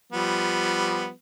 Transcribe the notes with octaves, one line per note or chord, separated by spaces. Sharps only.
F3 G3 B3